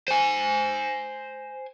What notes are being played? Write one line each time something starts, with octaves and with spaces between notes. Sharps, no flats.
C5 G#5